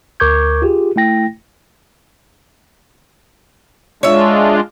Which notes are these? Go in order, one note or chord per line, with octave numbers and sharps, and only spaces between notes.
D2 A#4 C#6 D6 G6 G#6
F4 G4 G#4
A3 E4 G5 A#6
G#3 D4 F4 C#5 E5